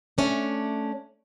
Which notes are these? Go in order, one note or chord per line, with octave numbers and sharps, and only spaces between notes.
A3 C#4 D4